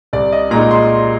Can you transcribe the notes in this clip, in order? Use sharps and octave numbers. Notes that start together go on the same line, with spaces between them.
C2 D5
D#5
A#2 G#3 D#4 A#5
C6